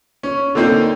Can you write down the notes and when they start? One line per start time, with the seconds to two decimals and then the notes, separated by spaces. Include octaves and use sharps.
0.23 C#4
0.55 D3 A#3 C4 D#4 C5